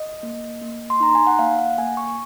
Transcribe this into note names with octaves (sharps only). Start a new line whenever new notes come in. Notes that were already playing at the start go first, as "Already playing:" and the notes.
Already playing: D#5
A#3
A#3
C6
D#4 A#5
G#5
F#5
A#3 F5
F#5
A#3 G#5
C#6